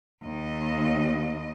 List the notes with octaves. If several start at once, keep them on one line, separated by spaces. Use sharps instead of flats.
D#2 D#5